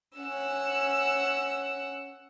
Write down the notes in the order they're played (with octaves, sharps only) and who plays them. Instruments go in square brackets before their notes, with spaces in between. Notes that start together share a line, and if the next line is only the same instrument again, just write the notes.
[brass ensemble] C#4 [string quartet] F#5 E6